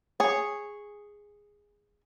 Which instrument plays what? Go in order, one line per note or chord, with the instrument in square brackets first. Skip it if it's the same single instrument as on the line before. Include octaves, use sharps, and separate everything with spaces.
[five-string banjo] G#4 C#5